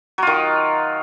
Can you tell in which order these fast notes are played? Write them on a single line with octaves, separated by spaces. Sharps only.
F#3 F4 D#3